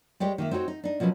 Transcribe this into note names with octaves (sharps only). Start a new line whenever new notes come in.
G3 G#3 G4 C#5
D#3 A#3 E5
C4 D#4 F#4 A#4 C#5
D#4
D4 D#4
B2 F3 F#3 C#4 B4